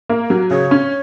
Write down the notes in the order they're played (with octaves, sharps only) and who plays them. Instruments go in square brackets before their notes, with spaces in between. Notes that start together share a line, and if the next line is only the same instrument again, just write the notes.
[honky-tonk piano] A#3
F#3
[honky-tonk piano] C#3 [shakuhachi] C#5
[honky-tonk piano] C#4